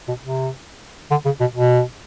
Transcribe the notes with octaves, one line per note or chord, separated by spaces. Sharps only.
B2
C3
D3
C#3
B2
B2